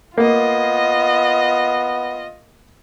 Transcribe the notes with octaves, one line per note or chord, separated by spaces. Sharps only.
A#3 B3 F4 D#5